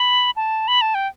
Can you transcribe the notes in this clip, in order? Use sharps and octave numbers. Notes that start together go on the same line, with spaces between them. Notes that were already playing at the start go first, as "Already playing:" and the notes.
Already playing: B5
A5
B5
A5
G5